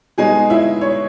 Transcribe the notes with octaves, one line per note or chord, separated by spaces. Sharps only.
B2 G#3 D#4 G#4 G#5
E4 E5
C#5